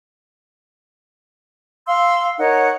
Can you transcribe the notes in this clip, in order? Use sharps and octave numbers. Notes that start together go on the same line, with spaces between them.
F5 C6 E6
D#4 A#4 C#5 F#5